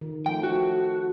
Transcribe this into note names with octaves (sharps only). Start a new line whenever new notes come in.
D#3
F3 A3 G5
F#4